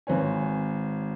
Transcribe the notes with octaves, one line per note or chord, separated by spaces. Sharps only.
G#1 C4 B4 C#5 G#5